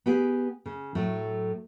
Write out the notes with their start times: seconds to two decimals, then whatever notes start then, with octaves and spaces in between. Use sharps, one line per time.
0.06 B3 G4 G#4
0.66 C#3
0.95 A2 F#3 A3